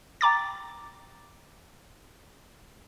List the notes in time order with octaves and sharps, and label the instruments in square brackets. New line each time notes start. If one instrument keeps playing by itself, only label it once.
[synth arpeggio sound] G5 A#5 D6 A6